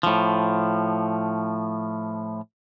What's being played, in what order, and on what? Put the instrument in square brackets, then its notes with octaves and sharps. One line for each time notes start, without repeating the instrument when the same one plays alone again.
[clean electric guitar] A2 F3